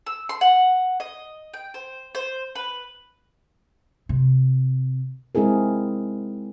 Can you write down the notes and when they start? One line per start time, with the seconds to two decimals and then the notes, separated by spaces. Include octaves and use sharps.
0.07 E6
0.29 C6
0.41 F#5
1.00 D#5
1.54 G5
1.74 C5
2.15 C5
2.55 B4
4.09 C3
5.35 G#3 C4 E4 G#4 A#4